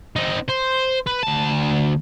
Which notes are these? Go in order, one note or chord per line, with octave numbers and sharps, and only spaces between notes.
C4 D#4
C5
B4
D2 A5